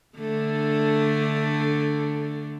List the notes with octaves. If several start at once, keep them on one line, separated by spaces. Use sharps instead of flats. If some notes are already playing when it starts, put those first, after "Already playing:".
D3 A3 D4